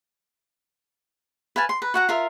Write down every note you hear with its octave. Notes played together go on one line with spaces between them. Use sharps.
B4 F5 G#5 A5
C6
B4 A#5
F#4 F#5 A#5
F4 A#4 E5